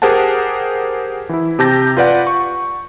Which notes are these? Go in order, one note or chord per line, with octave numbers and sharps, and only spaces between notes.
G4 G#4 A#4 C5 F#5 A5
E3 E4
C3 G4 A5 G6 A#6
F4 B4 D5 F#5
C#6